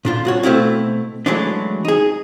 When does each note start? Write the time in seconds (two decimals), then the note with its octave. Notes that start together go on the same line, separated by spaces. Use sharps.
0.05 A#2 D4 F4
0.25 C2 F#4 C#5
0.43 B2 A3 C4 E4 F5
1.26 E3 F#3 G#3 A3 D4
1.85 D#4 G#4